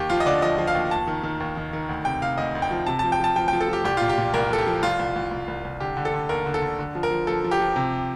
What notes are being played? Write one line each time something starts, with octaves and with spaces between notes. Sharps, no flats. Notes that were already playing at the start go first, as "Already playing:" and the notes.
Already playing: D#2 G4
F3 F4
D#5
D3 D5
F3 D#5
F3
F5
D#2
D#2 A5
D#3
D#3
D#2
D#3
D#3
D2
C3 G5
C3 F5
D2 D#5
D2
G5
F3
C3 A5
A5
F3
G5
F3 A5
F3 G5
G5
F3
A4
F3 G4
C2 G4
F4
A#2
G4
A#2
C2 A#4
C2 A4
G4
F3
C2 F4
C2
C2
C2
C2
C2
D3 G4
D3
A4
D3
D#2 A#4
D3
A4
D3
D3
F3
A#4
F3
F3 A4
F3
G4
F3
C3